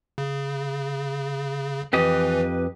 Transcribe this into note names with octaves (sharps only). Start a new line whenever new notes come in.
C#3
F2 E3 G4 B4 D#5